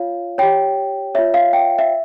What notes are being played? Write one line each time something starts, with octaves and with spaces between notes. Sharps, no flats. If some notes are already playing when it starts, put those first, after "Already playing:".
Already playing: F4 C#5 F5
G4 C#5 G5
F4 C#5 E5
F5
G5
E5